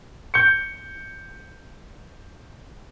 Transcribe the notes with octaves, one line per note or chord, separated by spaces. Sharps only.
G6 C#7